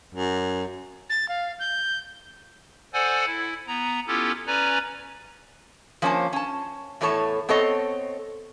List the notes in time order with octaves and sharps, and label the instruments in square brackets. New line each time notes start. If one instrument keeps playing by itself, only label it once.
[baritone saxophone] F#2
[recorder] A6
F5
G6
[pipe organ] A4 C5 D5 F#5 G#5
E4
B3 A#5
B3 C#4 E4 F4 G4 A4
C#4 B4 D5 G#5 A#5
[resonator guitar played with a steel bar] F3 A#3 C#4 C5 D5 A5
C#4 A5
E2 A2 A4 C#5 A5
B3 C4 A4 C#5 D#5